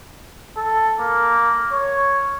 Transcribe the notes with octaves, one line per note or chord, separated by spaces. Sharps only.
A4
A#3
C#5